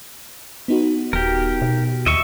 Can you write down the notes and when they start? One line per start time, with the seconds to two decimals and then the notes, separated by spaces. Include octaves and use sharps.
0.68 B3 D#4 F#4
1.13 D#1 G4 A#4
1.62 B2
2.06 D#2 D#5 E5 C#6